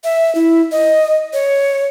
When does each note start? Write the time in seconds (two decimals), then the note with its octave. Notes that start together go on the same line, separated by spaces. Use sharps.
0.04 E5
0.35 E4
0.72 D#5
1.33 C#5